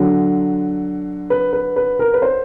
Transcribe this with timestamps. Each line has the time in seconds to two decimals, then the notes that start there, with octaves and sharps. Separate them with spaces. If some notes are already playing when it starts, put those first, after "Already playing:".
Already playing: D3 F#3
1.30 B4
1.53 B4
1.76 B4
1.99 A#4
2.14 B4
2.22 C5